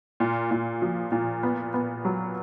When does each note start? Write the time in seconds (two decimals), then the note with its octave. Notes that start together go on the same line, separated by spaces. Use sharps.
0.20 A#2
0.51 A#2
0.82 F3
1.12 A#2
1.43 B3
1.74 B3
2.05 F#3